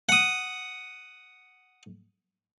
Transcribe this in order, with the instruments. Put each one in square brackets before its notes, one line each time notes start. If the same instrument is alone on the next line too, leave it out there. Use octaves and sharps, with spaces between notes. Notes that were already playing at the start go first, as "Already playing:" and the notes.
[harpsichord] F#5 D#6